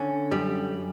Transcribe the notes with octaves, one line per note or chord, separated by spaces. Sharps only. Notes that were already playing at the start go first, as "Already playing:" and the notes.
Already playing: D3 C#4
F#2 G3